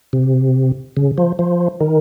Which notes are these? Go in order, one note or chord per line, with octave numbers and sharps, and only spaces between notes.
C3
C#3
F3
F3
D#3